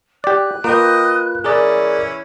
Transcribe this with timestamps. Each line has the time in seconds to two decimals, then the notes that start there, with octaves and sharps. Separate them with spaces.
0.24 G4 D5 F#6
0.64 A#3 F4 B4 D#5 G5
1.44 E3 C#4 G#4 A#4 D5